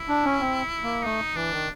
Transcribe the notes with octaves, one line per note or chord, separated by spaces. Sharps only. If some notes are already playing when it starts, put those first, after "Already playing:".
Already playing: E4
D4
C#4
C4
A#3
A3 D#4
E3 D4
D#3